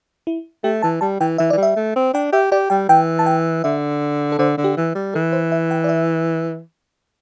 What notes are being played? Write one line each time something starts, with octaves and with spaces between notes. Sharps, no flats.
E4
A3 G4
E3 A5
G3 A5
E3 G5
E3 E5
E3 D5
G3
E5
A3
C4
D4 G5
G4 E5
G4 D5
G3 G5
E3 G5
A5
G5
D3 E5
A4
D3 C5
D3
G4
E3
G3
E3 A4
C5
E5
G5
D5
E5